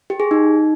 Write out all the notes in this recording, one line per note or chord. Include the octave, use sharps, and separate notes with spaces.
G4
G#4
D#4